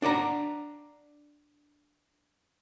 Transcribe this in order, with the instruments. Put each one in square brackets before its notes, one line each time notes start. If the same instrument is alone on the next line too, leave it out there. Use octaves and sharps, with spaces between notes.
[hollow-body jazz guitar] D4 D5 F#5 A#5